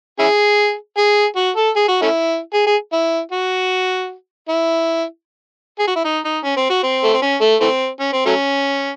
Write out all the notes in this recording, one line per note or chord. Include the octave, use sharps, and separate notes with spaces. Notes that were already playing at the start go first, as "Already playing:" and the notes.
C#4 E4 G#4
G#4
F#4
A4
G#4
F#4
A3 C#4 E4
G#4
G#4
E4
F#4
E4
G#4
F#4
E4
D#4
D#4
C#4
C4
F#4
C4
A3
C4
C#4
A3
E3 A3 C4
C#4
C4
F#3 A3 C#4